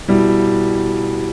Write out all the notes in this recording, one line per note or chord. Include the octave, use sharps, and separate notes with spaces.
B2 G3 E4